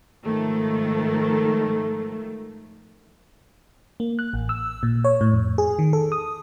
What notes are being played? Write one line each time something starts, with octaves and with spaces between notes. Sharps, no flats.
G#2 D#3 F3 A3
A#3
F#6
A1
E6
A#2
C#5
A2
F2
G#4
D#3
A4
D#6